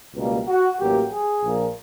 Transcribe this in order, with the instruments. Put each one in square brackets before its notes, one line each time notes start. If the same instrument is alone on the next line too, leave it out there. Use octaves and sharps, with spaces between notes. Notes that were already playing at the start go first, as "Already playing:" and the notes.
[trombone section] C#2 B2 G3 A#3
F#4
A1 A2 F#3 A#3 G4
G#4
A#1 A#2 F3 A#3